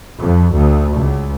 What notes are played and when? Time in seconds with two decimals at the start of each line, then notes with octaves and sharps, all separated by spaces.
0.21 F2
0.54 D2
0.95 C#2